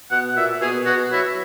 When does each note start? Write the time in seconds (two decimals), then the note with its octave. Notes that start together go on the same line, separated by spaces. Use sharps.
0.11 B2 F#5
0.36 A#2 E5
0.61 B2 G#4
0.86 B2 F#4
1.11 F#3 E4